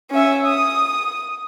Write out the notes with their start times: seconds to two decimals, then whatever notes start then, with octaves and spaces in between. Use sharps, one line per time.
0.11 C#4 E5
0.46 D#6